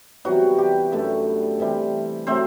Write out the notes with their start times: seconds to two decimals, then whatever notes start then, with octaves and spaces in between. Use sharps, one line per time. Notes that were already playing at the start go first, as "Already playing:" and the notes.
0.25 C3 E3 F#3 G3 B3 F#4
0.58 G3 G4
0.92 F#2 D3 G3 A3 B3 A4
1.60 C3 E3 G3
2.27 C3 F#3 A3 C4 C5